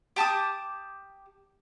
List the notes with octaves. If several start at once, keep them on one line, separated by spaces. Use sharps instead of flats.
G4 A5 D6 D#6